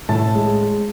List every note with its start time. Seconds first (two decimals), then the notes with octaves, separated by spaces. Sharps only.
0.09 A2 A5
0.35 G#3
0.61 G#3